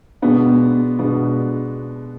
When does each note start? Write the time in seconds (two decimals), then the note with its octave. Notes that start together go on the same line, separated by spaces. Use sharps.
0.22 B2 G#3 B3 D4
0.99 B2 G#3 B3 D4